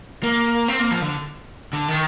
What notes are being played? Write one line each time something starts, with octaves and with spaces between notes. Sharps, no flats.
A#3
C4
A#3
F3
D3
D3
D#3